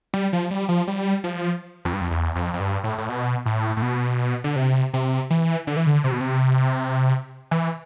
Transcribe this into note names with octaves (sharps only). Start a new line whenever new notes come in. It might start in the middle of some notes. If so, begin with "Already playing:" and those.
G3
F3
G3
F3
G3
F3
F2
G2
F2
E2
F2
F2
G2
A2
A2
B2
A2
A2
B2
D3
C3
C3
E3
D3
E3
D3
C3
B2
C3
E3